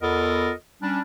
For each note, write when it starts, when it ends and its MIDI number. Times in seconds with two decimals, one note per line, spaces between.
0.02 0.52 40
0.02 0.52 59
0.02 0.52 65
0.02 0.52 69
0.02 0.52 70
0.02 0.52 75
0.82 1.01 55
0.82 1.01 61
0.82 1.01 62